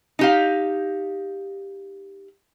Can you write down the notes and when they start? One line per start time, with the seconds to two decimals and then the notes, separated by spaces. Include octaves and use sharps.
0.19 D#4 G4 F5